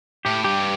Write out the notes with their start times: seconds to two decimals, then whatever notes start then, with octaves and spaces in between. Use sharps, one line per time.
0.25 A2 G4
0.44 G2 G4